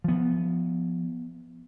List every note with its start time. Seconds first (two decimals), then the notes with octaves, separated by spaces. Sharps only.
0.04 F3 B3